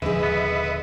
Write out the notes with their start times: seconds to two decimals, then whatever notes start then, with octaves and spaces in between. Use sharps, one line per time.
0.02 D#1 G#2 D3 F3 G#4 B4 D#5 E5
0.23 B3